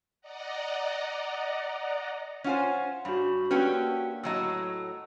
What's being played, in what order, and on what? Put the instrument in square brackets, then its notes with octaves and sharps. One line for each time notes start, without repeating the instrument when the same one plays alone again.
[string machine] D5 D#5 F#5 A#5
[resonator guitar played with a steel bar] C#4 F4 C5 [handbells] C#5 F#5 G#5
[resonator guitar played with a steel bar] G2 [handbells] F#4 B5
[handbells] A#3 D4 B4 [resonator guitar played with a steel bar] C#4 F#4 G4
[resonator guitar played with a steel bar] A2 F#3 D#5 [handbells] A#5 E6